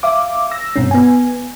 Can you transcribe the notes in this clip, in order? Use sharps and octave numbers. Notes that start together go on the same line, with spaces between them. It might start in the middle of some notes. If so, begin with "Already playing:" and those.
E5 F5 D6
E6 A#6
G2 B2 C4 C#4
B3 G#5